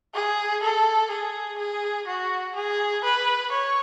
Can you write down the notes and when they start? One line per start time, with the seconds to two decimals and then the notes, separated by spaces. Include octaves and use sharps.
0.14 G#4
0.62 A4
1.11 G#4
1.58 G#4
2.07 F#4
2.56 G#4
3.04 B4
3.52 C#5